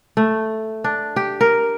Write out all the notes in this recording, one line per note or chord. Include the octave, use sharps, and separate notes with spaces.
A3
D4
G4
A#4